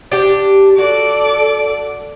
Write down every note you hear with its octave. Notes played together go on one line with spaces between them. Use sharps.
D4 G4
F#4 A4 D5